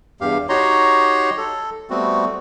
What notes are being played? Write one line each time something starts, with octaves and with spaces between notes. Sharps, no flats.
E2 G2 G4 F5
D#4 F#4 G4 C#5 A#5 C6
A4
G3 A3 B3 C4 F#4